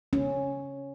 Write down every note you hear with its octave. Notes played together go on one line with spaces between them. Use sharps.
C#4